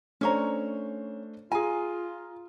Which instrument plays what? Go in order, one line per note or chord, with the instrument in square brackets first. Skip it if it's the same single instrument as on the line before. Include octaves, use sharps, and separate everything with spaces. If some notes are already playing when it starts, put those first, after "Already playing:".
[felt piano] A3 D4 C5 [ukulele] C#4 C#5 A#5
[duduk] F4 [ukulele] G#4 G#5 [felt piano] A#5